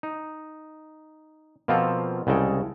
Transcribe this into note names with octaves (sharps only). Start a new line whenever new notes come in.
D#4
B2 F3 A#3 C4 F4 A4
C2 C#3 G#3 A4 G5